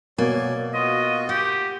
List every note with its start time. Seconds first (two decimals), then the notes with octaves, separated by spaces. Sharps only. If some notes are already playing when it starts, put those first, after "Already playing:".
0.18 B2 F#3 A#3 D5 G#5
0.74 F4 F#4 D#5
1.29 G4 F#5